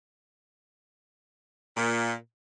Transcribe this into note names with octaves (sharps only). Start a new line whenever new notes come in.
A#2